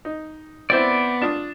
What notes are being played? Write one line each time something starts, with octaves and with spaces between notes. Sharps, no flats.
D#4
B3 C4 E4 C5 D5
D4 F4 D#6